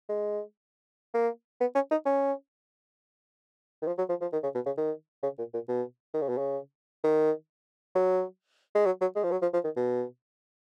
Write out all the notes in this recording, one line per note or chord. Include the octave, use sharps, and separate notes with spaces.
G#3
A#3
B3
C#4
D#4
C#4
D#3
F3
F#3
F3
F3
D#3
C#3
B2
C#3
D#3
C#3
A#2
A#2
B2
D#3
C#3
B2
C#3
D#3
F#3
G#3
F#3
F#3
G#3
F3
F#3
F3
F3
D#3
B2